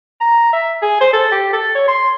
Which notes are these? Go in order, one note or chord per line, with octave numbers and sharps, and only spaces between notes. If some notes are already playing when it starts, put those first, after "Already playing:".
A#5
E5
G#4
C5
A4
G4
A4
C#5
C6